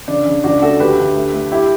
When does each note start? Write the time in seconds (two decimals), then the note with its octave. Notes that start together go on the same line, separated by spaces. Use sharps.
0.08 C#3 D4
0.26 C#3
0.44 C#2 D4 F#4
0.62 A3 F#4 A4
0.80 D2 G4 B4
0.98 D2
1.16 A3
1.34 A3
1.52 E4 G4